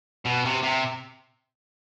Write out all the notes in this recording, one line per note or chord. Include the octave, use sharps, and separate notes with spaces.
B2
C3
C3